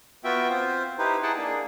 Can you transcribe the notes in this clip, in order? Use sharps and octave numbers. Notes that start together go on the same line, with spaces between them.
B3 F4 F#4 E5 G5
C4 F4 C5
D#4 E4 G4 B4 C5
D#4 E4 G#4 F#5 G5 A5
A#3 D4 G#4